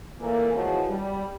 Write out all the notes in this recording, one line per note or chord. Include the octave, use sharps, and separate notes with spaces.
A#2 E3 A3 A#3
E3 F3 G#3 C#4 E4 F#4
G3